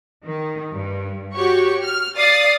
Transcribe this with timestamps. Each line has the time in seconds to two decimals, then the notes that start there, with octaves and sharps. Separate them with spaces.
0.24 D#3
0.72 G2
1.34 F#4 G4 C#5 C#6
1.84 F6
2.16 D5 F5 D#6 A6 C7